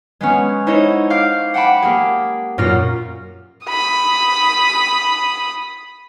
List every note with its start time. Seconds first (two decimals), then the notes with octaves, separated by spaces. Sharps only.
0.21 G#3 B3 C#4
0.67 D#4 E4 C5 C#5 D#5
1.10 F5 D6 G6
1.54 F#5 G5 A5 B5 D6
1.82 A#3 G4 G#4
2.58 F#2 A#2 A#3 F4 A#6
3.65 B5 D#6